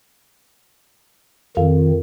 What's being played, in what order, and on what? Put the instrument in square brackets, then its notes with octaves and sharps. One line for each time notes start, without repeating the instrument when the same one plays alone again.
[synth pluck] F2 [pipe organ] D#3